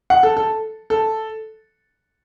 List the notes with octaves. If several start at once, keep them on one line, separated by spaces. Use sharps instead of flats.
F#5
A4
A4
A4